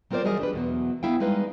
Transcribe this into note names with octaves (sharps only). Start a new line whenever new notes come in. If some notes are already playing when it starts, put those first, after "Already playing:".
F#3 C4 F4 A#4 C5 D5
E3 F#3 G3 G#4 A#4 D#5
D4 G4 B4
E2 B2 F#3
B3 E4 F5 G5
G3 G#3 D#4 B4 D#5 F5